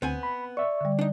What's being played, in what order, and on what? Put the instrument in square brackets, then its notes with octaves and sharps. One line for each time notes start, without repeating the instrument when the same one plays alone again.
[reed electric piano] D2 [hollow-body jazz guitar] B3 C4 G#5
[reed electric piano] B5
[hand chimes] D5 [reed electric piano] E5 C#6
[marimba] D3 G3
[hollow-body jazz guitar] D4 D#4